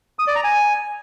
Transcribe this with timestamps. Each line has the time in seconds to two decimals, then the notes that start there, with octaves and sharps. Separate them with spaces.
0.19 D#6
0.27 D5
0.36 A#5
0.44 G#5